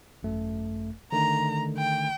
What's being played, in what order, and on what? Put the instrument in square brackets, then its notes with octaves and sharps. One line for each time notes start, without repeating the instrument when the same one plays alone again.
[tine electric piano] G#1 F#2 A3
[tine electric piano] D3 D#3 A3 [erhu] A#5
[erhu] G5